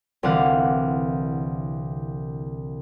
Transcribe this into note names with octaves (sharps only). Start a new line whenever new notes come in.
C2 D3 E3 F5 F#5